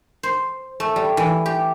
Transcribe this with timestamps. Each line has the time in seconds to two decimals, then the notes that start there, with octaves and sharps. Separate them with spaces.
0.23 C5
0.80 A3
0.96 G3
1.17 E3
1.46 G4